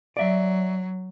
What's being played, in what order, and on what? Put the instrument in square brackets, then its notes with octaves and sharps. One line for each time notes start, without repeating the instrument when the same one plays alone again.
[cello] F#3 [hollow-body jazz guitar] D5 E5